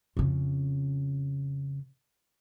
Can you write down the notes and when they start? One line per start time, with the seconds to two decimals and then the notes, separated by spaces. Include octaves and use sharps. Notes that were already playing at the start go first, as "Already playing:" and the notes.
0.17 F2 C#3